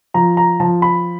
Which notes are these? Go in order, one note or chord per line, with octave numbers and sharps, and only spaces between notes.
F3 A#5
A#5
F3 A5
B5